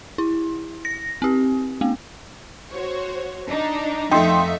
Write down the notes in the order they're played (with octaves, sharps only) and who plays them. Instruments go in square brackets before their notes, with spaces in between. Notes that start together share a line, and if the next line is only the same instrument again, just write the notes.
[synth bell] E4
A#6
C4 G4
A3 B3
[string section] F#4 C5 C#5
D4 D#4
[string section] F2 E5 F5 [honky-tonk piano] A3 D#4 [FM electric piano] G5 C6